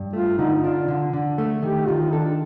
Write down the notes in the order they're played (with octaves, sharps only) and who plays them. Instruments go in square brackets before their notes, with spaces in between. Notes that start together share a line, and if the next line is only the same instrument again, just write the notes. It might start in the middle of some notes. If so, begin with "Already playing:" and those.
Already playing: [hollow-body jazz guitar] G2
[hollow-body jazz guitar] A3 [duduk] F4
[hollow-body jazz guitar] D3 [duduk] D#4
[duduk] D#4
[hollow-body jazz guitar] D4 [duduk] F4
[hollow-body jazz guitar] D3
D3
A3
[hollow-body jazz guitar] D#3 [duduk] G4
[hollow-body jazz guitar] D#3 [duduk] F4
[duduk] D4 [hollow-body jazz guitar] A4